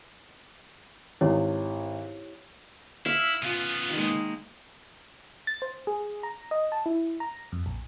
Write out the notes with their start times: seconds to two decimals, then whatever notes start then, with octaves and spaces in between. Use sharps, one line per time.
1.21 G#1 E4 G4 C#5
3.06 E4 E5 F5
3.43 C#3 B3 F4
3.90 D#3 G#3 A#3
5.47 A6
5.62 C5
5.87 G#4
6.23 A#5
6.51 D#5
6.72 A5
6.86 E4
7.20 A#5
7.52 F2
7.66 A#1